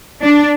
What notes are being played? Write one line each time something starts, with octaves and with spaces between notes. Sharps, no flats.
D4